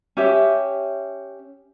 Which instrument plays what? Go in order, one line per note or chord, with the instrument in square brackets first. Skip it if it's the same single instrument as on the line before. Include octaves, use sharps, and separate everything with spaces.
[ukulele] C#4 G4 E5